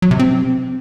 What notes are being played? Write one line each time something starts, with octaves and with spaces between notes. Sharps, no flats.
F#3
C3
C4